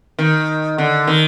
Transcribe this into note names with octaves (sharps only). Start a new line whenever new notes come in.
D#3
D3
D#3